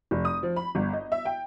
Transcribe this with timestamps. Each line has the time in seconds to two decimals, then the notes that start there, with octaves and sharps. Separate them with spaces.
0.11 F1
0.25 D#6
0.43 F3
0.56 B5
0.75 G1
0.93 D#5
1.12 E5
1.25 G5